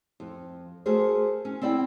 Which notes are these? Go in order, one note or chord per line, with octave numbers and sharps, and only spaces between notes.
F2
A3 F#4 G#4 A#4 C5
C#4
C4 E4 D5 G5